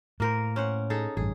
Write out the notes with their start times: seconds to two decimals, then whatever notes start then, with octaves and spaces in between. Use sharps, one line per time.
0.20 A2 A#3 A#4 C5
0.56 C#4 C5 F#5
0.90 D#4 G#4 A4
1.17 A1 G2 G#4